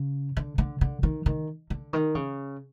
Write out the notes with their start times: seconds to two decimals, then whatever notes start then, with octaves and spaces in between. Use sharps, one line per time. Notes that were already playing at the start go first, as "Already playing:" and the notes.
Already playing: C#3
0.37 D3
0.58 D3
0.81 D3
1.03 D#3
1.26 D#3
1.70 D3
1.93 D#3
2.15 C#3